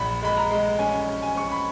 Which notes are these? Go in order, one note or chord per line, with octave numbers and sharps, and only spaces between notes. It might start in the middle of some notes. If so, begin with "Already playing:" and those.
Already playing: A#1 B5
G#3 B5
A#5
G#3
C#4 G#5
C#4
G#5
C#4 C#6
B5